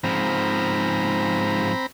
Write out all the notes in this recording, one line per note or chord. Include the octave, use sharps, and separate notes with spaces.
G#2 F3 C4 A#5 B5